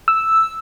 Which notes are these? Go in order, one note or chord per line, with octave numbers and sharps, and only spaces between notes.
E6